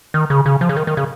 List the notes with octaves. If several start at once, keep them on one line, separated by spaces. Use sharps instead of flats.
D#3
C#3
C#3
F3
C#3
D#3
D#3
C#3